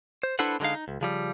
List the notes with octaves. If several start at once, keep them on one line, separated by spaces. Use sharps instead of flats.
C5
D4 E4 A4 B4 C5 F#5
D3 F#3 G#3 D#4 F5
D#4
C#2
C#3 F3 G3